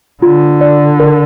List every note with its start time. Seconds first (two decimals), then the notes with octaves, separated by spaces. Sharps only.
0.22 D3 F4
0.61 D5
1.00 A#4